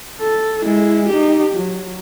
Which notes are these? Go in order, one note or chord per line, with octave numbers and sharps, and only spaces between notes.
A4
G#3 E4
D#4 G4
F#3